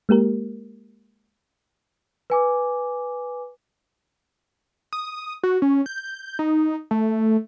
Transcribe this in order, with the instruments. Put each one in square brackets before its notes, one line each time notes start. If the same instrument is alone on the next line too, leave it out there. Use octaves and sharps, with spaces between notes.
[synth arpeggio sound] G#3 A#3 G4 A#4
[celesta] B4 G#5 D6
[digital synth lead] D#6
F#4
C#4
G6
D#4
A3